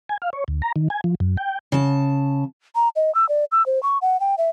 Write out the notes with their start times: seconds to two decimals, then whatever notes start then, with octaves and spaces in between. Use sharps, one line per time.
0.09 G#5
0.22 F5
0.33 C#5
0.48 D2
0.62 A#5
0.76 D#3
0.90 G#5
1.04 F3
1.20 F#2
1.37 G5
1.72 C#3 A5
2.75 A#5
2.96 D#5
3.15 E6
3.29 D5
3.52 E6
3.66 C5
3.83 C#6
4.02 F#5
4.20 G5
4.38 E5